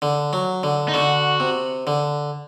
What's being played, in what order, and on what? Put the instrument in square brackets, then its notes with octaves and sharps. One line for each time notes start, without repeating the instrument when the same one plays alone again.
[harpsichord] D3
F#3
D3
[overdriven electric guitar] D#4
[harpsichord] D3 [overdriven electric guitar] F#4
[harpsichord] C3
D3